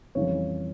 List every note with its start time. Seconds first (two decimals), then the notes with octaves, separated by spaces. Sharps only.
0.15 F2 C#3 E3 G3 C#5